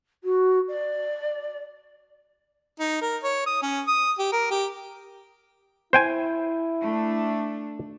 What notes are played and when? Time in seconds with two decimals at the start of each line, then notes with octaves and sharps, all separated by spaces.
0.24 F#4
0.68 D5
2.79 D#4
3.01 A#4
3.23 C#5
3.46 D#6
3.62 C#4
3.87 D#6
4.19 G4
4.32 A#4
4.51 G4
5.93 E4 C5 G5 G#5
6.84 A3 D4